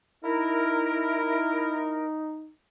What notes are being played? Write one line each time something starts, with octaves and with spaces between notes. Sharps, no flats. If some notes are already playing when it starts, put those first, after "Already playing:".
D#4 E4 A#4